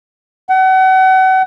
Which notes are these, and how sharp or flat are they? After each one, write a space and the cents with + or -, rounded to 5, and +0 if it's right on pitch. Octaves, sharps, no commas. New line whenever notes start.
F#5 +35